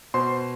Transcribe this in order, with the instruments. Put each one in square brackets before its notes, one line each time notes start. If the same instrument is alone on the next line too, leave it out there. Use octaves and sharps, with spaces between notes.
[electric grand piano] B2 C5 C6